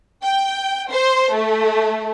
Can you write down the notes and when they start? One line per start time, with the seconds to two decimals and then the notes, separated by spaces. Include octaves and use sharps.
0.24 G5
0.92 C5
1.34 A3